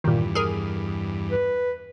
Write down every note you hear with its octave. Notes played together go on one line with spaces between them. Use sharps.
E2 G2 A#2 D#3
G#4 A#4
B4